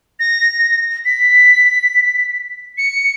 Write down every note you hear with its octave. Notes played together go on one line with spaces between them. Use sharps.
A#6
B6
C#7